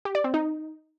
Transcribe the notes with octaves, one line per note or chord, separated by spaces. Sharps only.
G4
D5
C4
D#4